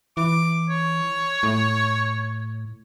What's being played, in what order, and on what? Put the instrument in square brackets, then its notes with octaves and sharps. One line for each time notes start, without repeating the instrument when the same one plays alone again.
[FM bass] E3 [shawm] D6
[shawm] C#5
[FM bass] A2